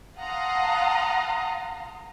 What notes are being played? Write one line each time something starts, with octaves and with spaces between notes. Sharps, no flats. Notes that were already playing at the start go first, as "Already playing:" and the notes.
F5 F#5 A5 A#5 C6 D#6